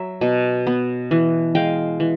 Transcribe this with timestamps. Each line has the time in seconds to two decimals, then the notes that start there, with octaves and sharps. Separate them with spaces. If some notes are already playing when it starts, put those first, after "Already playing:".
Already playing: F#3 E5
0.21 B2
0.67 B3
1.11 E3
1.55 G#3 F5 G5
2.00 E3